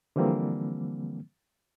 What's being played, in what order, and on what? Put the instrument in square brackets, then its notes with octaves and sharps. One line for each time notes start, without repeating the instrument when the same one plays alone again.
[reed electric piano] D3 E3 F3 G3 A#3 C4